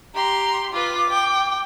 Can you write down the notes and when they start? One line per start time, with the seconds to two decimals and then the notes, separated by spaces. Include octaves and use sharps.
0.15 G4 A#5 C6
0.73 F4 B4 D6
1.09 G5